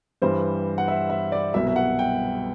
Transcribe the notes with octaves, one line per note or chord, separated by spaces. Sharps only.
G2 E3 G3 C5
F#5
E5
E5
D5
C2 B2 F#3 E5
E5
F#5
G5